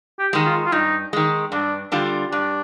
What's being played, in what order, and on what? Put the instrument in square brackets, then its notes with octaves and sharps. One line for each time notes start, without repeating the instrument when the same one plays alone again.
[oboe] G4
[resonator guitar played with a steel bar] D#3 G#3
[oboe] F4
F4
[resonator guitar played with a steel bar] G2 [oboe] D#4
[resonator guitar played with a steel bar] D#3 G#3
[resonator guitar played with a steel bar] G2 [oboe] D4
[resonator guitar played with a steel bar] D3 G3 D4 F4
[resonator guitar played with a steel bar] G2 [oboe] D4